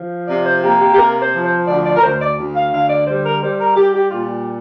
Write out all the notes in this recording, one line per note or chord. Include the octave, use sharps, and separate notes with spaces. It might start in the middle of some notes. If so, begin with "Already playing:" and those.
Already playing: F3
C3 D5
C5
A#3 G4
G4
G4
C3 A#4
C5
F3
C5
D2 D5
D5
A#4
D2 C5
D5
D2
F5
D3 F5
D5
G3 C5
A#4
G3 C5
A#4
G3 G4
G4
A#2 F4